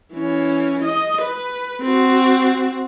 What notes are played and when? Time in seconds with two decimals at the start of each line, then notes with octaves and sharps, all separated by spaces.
0.14 E3 C#4
0.84 D#5
1.21 B4
1.82 C4 F#4